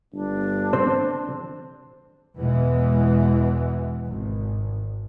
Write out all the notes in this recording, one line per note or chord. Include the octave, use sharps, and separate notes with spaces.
G1 D4
C4 C5
E2 B2 E3 G#3
G#1